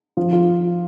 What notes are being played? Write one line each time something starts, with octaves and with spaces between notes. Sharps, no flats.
F3 F4
F4